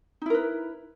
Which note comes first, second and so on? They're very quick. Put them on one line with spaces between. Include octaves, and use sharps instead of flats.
D#4 E4 A#4 B4